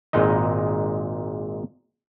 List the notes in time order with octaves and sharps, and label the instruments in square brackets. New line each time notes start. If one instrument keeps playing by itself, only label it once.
[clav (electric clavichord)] G#1 A#2 G#3 D#4 D#5